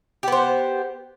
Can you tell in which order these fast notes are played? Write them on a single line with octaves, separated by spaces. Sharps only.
G4 B3 C5